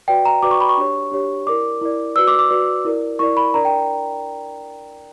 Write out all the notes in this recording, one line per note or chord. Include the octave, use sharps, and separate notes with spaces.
F#4 B4 D5 G5
A#5
F#4 B4 D5 D6
C#6
B5
C#6
D4 G4 C#5
D4 G4 C#5
E4 A#4 D5 D6
E4 A#4 D5
F#4 B4 D5 E6
D6
D6
F#4 B4 D5
E4 A#4 D5
E4 A#4 D5 C#6
B5
D4 A#4 D5 A#5
G5